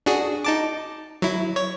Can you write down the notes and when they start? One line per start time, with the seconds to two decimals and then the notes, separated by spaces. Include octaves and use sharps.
0.06 D4 F#4 G#4
0.45 D#4 A5 D6
1.22 F#3 E4
1.56 C#5